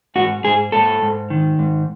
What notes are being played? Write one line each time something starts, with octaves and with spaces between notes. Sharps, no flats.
G#2 F#4
G#2 G#4
G#2 A4
G#2
D#3
G#2